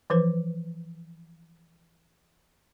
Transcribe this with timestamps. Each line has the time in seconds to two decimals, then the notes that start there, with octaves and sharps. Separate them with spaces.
0.10 E3 F3 B4 C5